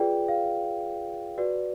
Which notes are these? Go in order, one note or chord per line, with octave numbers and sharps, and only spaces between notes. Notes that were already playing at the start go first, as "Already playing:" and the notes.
Already playing: F4 G#4 B4 D5 G5
F5
F#4 B4 D5